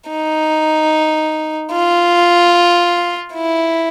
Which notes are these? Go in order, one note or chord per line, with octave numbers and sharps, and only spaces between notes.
D#4
F4
E4